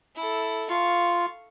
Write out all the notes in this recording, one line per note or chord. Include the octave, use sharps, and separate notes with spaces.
E4 A4
F4 F5 C#6